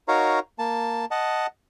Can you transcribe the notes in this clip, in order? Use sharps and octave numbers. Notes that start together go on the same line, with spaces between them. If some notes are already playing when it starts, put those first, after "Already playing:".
D#4 F#4 A#4 C#5 F5 A#5
A#3 A5
D#5 F#5 A5